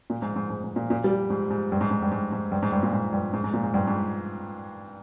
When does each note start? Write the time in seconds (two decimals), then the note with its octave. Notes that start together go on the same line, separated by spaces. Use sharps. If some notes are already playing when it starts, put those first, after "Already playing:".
0.10 A#2
0.22 G#2
0.36 G#2
0.50 G#2
0.64 G#2
0.76 A#2
0.90 A#2
1.04 G3
1.30 G#2
1.50 G#2
1.72 G2
1.81 G#2
1.91 G#2
2.02 G2
2.11 G#2
2.32 G#2
2.52 G2
2.62 G#2
2.72 G2
2.83 A#2
2.93 G#2
3.12 G2
3.33 G#2
3.44 G#2
3.54 A#2
3.63 G#2
3.74 G2
3.87 G#2